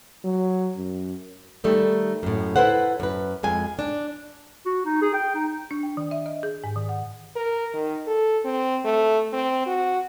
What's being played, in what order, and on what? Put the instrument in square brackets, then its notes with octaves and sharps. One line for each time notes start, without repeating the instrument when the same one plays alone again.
[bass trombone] F#3
F#2
[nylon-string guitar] D#3 G3 A3
F#2 A2
E4 A4 B4 C5 F#5
F#2 B4
F2 G#3 G#5
D4
[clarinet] F#4
D#4
G#4
G5
D#4
[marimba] D4
G5
D#3
E5
D#5
G#4
G#2
D#3
F#5
[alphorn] A#4
D#3
A4
C4
A3
C4
F#4